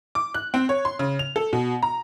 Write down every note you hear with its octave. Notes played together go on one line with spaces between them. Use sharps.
D6
F#6
C4
C#5
C6
C#3
F7
A4
B2
A#5